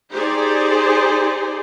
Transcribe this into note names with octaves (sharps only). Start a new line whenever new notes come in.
D#4 G4 G#4 C5 D5